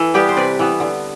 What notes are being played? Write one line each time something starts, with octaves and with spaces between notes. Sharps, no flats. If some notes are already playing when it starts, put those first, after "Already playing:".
Already playing: E3 A4
G3 B3 G4 B4
C5
C3 B4 D5
E3 B3
D3